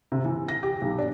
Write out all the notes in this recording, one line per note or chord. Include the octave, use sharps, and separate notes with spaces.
C3
E3
A#6
G4
B1
D4